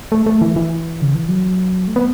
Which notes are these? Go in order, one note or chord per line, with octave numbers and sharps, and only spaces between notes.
A3
A3
E3
E3
C#3
E3
F#3
A3
B3